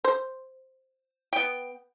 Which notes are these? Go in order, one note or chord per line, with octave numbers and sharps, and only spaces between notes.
C5
B3 G5